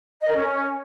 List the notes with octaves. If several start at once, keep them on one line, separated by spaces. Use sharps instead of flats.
D#5
A#4
C#4